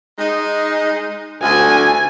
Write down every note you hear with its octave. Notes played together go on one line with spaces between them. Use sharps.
G#3 D#4
D2 G#5